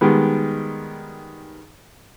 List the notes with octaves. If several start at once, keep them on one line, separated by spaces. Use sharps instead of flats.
D#3 G3 G#3 B3